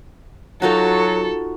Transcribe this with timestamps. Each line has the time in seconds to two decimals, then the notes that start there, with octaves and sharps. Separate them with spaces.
0.62 F#3 D#4 F4 F#4 A4